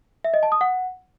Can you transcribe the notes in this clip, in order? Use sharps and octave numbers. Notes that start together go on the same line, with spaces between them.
E5
D#5
A5
D#6
F#5